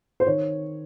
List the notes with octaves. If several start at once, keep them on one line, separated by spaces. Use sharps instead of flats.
C5
D#3 C#5